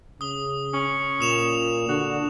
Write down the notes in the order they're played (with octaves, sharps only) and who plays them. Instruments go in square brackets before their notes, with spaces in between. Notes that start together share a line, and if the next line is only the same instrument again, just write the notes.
[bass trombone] C#3 [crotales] D#6 G7
[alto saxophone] C#4
[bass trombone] A#2 [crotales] D#6 E7 F7
[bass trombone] D3 [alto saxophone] F#4